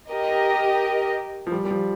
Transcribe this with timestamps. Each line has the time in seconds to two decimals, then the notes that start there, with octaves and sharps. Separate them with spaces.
0.11 G4 A#4 D#5
1.47 F3
1.52 G3
1.65 G3
1.71 F3